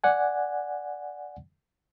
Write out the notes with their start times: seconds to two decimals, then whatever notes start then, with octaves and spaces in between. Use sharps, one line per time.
0.04 D5 F#5 G#5